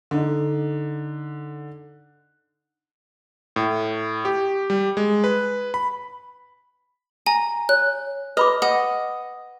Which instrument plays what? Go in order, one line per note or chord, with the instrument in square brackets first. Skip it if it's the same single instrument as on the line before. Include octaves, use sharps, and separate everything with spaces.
[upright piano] D3 D#4
[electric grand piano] A2
G4
G3
G#3
B4
B5
[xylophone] G#5 [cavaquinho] A#5
[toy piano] C#5 [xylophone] F#6
[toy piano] B4 B5 D6 [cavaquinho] D#5
[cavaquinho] D#5 [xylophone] F#5